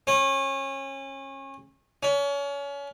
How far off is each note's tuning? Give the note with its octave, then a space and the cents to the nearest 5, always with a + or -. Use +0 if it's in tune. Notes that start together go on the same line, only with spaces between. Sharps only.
C#4 -30
C#4 +30